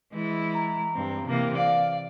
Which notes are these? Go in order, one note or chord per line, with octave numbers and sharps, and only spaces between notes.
E3 G#3 E4
A#5
G2 C4
C3 E3 A#3
D5 F5